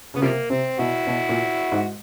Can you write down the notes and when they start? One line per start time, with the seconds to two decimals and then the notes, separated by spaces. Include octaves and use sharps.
0.14 C#3 B3
0.22 C3 F3 G3 A#3
0.50 C3 C4
0.79 B2 E4 F#4
1.07 B2
1.29 A#2
1.72 G#2